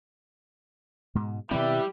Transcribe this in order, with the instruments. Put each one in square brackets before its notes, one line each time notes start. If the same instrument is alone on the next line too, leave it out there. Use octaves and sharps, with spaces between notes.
[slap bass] G#2 B2 G#3
[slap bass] B2 D#3 C4 [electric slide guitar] G3 G4 [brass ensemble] E4 B4 E5